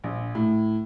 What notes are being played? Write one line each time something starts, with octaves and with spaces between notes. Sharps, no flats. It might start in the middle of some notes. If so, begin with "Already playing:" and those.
A#1
A2